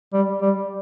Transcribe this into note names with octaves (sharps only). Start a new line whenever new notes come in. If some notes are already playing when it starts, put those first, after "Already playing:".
G3
G3